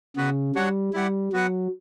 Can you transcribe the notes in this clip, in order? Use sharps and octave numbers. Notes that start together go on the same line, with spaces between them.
C#3 B3 F#4 B4
G3 D4 F#4 C#5 F#5
G3 E4 G4 D5 F#5
F#3 B3 F#4 B4 F#5